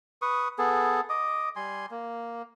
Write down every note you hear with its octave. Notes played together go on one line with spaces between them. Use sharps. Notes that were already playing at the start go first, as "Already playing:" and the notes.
B4 C#6 D#6
B3 G#4 A4
D#5 D6 D#6
G3 G#5 C6
A#3